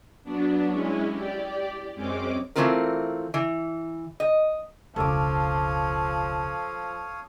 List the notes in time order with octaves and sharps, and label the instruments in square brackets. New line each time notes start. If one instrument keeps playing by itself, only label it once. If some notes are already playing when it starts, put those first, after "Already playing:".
[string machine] F#3 B3 D4
G#3 C#4 E4
G4 D5
F#2 G#3 C4 C#4 D6
[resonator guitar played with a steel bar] E3 F3 A3 C4 F4 A#4
E3
D#5
[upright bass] E1 C#2 [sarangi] F3 [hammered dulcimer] A4 D6 [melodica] C#5 F5 D#6